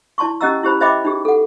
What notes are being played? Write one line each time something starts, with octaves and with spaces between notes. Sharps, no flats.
E4 D5 A5 C6 C#6
C#4 G4 D#5 F#5 A#5 E6
E4 G4 C5 B5
C5 D#5 E5 G5 B5 D6
D#4 G4 G#4
A4 F#5